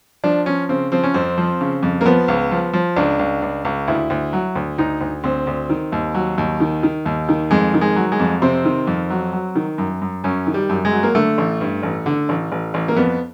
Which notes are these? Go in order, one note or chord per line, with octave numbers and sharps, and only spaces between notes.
F3 D4
F3 C#4
C#3 C4
F3 C4
C#4
F2 C4
F3
C#3
F2
A#3
F3 B3
C#2
F3
F3
C#2 D4
C#2
C#2
C#2
D2 E4
D2
F#3
D2
D2 D#4
D2
D2 C4
D2
D#3
D#2
F#3
D#2
D#3
D#3
D#2
D#3
F2 G#3
D#3
G#3
F#3
G#3
F2
C3 C4
D#3
F2
F#3
F#3
D#3
F#2
F#2
F#2 C#4
D#3
G3
F#2
G#3
F#3
A#3
D3 A3
A1
G2
A1
D3
A1
A1
A1
A#3
F2 B3